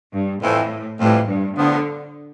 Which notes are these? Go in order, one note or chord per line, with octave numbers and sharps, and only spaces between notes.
G2
F2 A2 E3 A3 C4
F2 A2 E3 G3
G2
A2 D3 F3 B3